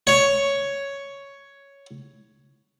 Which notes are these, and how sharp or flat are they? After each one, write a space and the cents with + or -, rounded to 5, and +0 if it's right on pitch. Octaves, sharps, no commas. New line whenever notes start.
C#5 +5